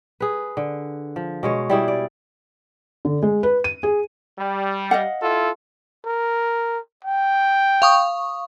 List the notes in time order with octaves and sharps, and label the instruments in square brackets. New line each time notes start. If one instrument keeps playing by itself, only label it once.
[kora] G#4 B4
D3
F3
B2 G#3 C#5
G3 E4 G#4 D5
D5
[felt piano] D3
G#3
B4
D#7
G#4
[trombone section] G3
[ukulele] D#5 F5 F#5
[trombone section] E4 F4 A4
[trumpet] A#4
G5
[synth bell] F5 C#6 D#6